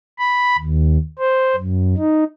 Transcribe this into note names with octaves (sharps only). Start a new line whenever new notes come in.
B5
D#2
C5
F#2
D#4